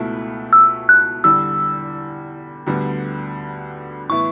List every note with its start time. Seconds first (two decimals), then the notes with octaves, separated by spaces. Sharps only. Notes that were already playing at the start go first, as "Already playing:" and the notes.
Already playing: C#2 B2 A3 E4
0.53 E6
0.89 F#6
1.24 E2 D3 G3 E6
2.66 D2 D3 G3 B3
4.09 A2 E3 B3 E4 C#6